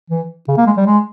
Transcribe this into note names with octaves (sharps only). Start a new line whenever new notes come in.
E3
C#3
A#3
G#3
G3
G#3